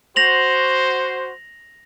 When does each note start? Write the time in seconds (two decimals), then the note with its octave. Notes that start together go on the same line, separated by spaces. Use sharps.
0.16 F#4 C5 A#6 F7 F#7